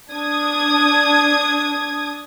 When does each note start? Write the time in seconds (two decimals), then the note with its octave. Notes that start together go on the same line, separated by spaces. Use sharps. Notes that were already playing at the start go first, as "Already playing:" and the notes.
0.12 D4 D#6 G#6